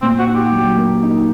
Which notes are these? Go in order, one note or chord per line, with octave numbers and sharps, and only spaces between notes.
A#2 C4
F#4
D#4
G4
F#3
A#3
D#4